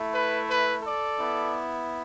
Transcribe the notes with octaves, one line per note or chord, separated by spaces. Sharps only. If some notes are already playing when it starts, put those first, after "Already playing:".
Already playing: A3 E4
B4
B4
A4 D5
B3 E4